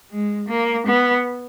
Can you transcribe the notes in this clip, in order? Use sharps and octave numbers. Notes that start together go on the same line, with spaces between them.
G#3
A#3
B3